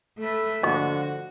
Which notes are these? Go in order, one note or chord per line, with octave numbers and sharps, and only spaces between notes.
A3 A4 B4
D3 F3 F#4 D#5 C#6